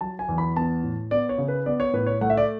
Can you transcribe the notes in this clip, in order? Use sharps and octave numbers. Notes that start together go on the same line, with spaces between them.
F#3 A5
G#5
E2
B5
B3 A5
A2
B3 D5
C#5
C#3
B4
B3 D5
C#5
A2 B4
C#5
A3 F#5
E5
D5